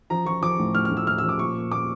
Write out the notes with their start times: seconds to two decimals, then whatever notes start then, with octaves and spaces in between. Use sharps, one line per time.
0.10 F3 A#5
0.26 F3 C#6
0.42 F3 D6
0.59 A2
0.75 A2 F6
0.85 F6
0.91 A2
0.97 E6
1.07 A2 F6
1.18 E6
1.24 F3
1.29 D6
1.39 A#2 C#6
1.56 A#2
1.72 A#2 D6